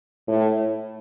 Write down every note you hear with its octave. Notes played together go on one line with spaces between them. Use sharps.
A2